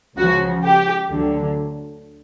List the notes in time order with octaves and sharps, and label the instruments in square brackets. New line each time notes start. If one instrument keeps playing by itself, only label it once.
[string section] C#2 C#3 F3 F#4
G4
D2 D3 F#3